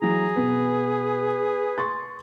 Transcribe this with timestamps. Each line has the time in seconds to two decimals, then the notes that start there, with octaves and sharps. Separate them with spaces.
0.02 E3 F#3 G#4 A#5
0.36 B2 B3 B4
1.78 C6 C#6 A6